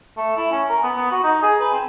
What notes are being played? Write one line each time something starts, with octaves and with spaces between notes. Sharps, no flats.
A3
E4
C#4
A#4
B3
B3
F#4
D#4
G#4
B4
C4